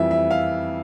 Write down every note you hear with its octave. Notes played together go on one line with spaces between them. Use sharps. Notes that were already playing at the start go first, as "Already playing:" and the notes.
Already playing: F2 E3 G3 E5
E5
F5